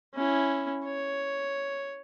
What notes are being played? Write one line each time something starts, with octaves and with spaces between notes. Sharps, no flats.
C#4 E4
C#5